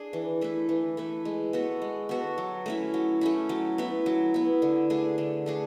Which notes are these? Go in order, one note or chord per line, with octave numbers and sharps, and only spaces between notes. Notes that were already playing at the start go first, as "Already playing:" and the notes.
Already playing: D4 G#4
E3
A3 E4 B4
E3
A3 E4 B4
G#3
B3 F#4 A4
G#3
B3 F#4 A4
F#3
A3 C#4 E4
F#3
A3 C#4 E4
F#3
B3 E4
F#3
B3 E4
D3
A3 D4 G#4
D3
A3 D4 G#4